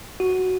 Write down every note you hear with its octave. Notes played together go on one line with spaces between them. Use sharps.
F#4